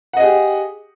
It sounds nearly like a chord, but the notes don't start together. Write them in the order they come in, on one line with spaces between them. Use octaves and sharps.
F#5 D#5 G#4 G4